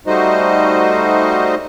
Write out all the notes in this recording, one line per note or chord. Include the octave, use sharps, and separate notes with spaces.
G3 A3 D#4 F#4 C5 D#5